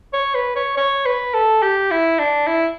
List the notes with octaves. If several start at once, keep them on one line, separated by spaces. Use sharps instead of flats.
C#5
B4
C#5
C#5
B4
A4
G4
E4
D4
E4